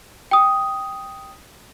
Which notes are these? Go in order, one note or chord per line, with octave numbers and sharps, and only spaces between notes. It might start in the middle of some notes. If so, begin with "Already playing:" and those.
G5 D#6